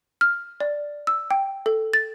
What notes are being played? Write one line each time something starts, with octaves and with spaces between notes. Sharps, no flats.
F6
D5
E6
G5
A4
A6